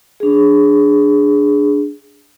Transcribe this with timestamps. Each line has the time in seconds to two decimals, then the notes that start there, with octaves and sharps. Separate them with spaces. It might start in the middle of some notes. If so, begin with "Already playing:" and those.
0.20 D4 G#4